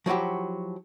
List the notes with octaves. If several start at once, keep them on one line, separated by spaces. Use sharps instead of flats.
F3 F#3 E4 F#4 G4